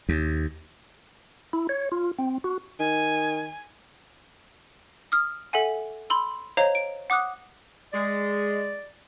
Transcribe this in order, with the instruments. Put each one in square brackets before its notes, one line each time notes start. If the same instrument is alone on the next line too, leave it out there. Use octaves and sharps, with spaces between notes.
[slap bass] D#2
[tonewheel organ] E4
C#5
F4
C4
F#4
[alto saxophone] D#3 [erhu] G#5
[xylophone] D#6 F6
A4 E5 F#5 G#5
B5 C6 E6
C5 C#5 D#5 F5 A#5
D7
F#5 D6 D#6 F#6
[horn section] G#3 [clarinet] D5